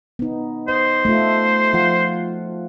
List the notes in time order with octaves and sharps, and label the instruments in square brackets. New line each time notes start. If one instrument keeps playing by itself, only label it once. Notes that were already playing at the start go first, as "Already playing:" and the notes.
[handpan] B3 D#4
[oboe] C5 [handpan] D#5
[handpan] A3 F4
F3 F4 F#5